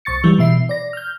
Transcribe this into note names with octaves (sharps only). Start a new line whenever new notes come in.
C2 C#6 A6 C#7
E3 G3
B2 E3 E5 C7
D5 A#6
F6 G6